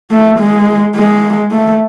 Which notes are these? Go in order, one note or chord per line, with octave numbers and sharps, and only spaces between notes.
A3
G#3
G#3
A3